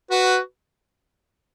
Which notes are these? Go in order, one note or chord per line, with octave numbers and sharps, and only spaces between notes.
F#4 B4